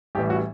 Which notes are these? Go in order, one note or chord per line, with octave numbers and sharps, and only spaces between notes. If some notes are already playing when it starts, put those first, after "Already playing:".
A1 A2 E3 G3 G4
F#4